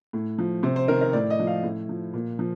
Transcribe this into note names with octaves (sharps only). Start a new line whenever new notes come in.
A2
F3
C3 C5
C5
D#3 A#4
A#4
A2 D5
D#5
F3
F5
A2
F3
A#2
F3